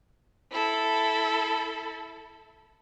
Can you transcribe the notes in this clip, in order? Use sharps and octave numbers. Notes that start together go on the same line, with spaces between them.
E4 A4